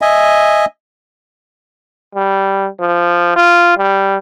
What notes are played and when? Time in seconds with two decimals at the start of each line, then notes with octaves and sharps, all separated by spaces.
0.01 D#5 E5 G#5
2.15 G3
2.79 F3
3.36 F4
3.77 G3